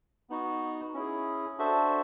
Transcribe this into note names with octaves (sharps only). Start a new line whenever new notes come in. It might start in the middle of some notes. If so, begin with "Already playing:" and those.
B3 D#4 F#4
C#4 E4 G#4
D4 F#4 A4 C5 E5